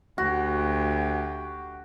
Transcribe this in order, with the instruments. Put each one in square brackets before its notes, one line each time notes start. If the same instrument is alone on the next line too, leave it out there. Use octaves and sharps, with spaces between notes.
[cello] D2 G4 [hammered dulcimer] F#4